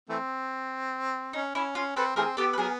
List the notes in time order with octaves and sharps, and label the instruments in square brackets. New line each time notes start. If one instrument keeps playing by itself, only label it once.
[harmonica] E3 A3 C4
[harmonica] C#4 [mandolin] D#4
[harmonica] C#4 [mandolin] E4
[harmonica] C#4 [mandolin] F4
[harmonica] C4 [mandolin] A4 B4
[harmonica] E3 A3 C4 [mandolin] G#4 A#4
[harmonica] B3 [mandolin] G4 A4
[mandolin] B4
[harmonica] F#3 B3 [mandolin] G#4 A#4